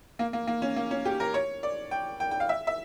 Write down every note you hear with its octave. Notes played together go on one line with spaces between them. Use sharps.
A#3
A#3
A#3
C#4
A#3
C#4
G4
A#4
C#5
D5
G5
G5
G5
F5
E5
E5